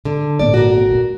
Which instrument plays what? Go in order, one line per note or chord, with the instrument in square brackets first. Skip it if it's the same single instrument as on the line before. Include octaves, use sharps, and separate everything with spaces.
[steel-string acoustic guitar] D3
[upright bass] G#1 A#2 [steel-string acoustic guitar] D5
[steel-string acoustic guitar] F#4 A#4
[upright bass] E4 F4